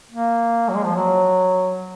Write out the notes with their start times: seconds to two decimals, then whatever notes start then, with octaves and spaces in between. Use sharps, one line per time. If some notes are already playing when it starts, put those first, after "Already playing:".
0.10 A#3
0.69 F#3
0.75 G#3
0.86 F3
0.96 F#3